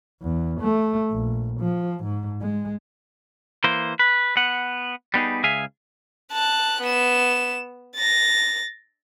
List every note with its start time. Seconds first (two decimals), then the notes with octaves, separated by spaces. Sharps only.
0.22 E2
0.61 A3
1.11 A#1
1.60 F3
2.04 G#2
2.41 G#3
3.64 E3 A#3 C5
3.99 B4
4.37 B3 F#5
5.14 G3 B3 D#4 G#4
5.44 C#2 G#4 E5 F5 G#5
6.32 A5 F#6
6.81 B3 E7
7.96 A6 A#6